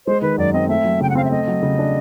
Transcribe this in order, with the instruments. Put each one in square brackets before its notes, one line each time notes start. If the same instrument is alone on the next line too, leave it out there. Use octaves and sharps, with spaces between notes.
[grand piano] G#3 [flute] C5
[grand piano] D#3 [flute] B4
[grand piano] F#2 [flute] D5
[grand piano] C4 [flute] D#5
[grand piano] A3 [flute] E5
[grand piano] F#3
[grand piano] C#3 [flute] G5
[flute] F#5
[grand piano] C4 [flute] F5
[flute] E5
[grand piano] A3 [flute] D#5
[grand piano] F#3
C#3
D4